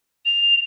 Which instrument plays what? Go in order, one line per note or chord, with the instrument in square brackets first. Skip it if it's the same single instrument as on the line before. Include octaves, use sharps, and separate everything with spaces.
[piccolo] F7